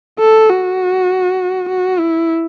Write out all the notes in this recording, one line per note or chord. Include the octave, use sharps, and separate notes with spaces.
A4
F#4
F#4
E4